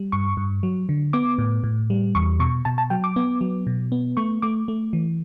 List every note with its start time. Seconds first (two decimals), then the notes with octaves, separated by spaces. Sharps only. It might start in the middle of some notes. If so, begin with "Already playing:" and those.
Already playing: G3
0.12 G2 C#6
0.37 G2
0.63 F#3
0.89 D3
1.13 B3 D6
1.38 A2
1.64 A2
1.90 G3
2.15 E2 C#6
2.40 B2 C#6
2.65 B2 A5
2.78 A5
2.90 F#3 G5
3.04 D6
3.16 B3
3.41 F#3
3.67 B2
3.92 B3
4.17 A3 C#6
4.42 A3 D6
4.68 A3
4.93 E3